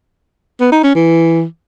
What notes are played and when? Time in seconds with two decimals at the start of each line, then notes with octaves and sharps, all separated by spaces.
0.60 B3
0.72 D#4
0.83 C#4
0.95 E3